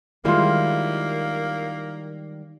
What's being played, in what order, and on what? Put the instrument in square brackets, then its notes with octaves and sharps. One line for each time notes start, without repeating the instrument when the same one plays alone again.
[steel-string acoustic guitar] D#3 G3 G#3 [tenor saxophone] A#3 [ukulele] E4 F4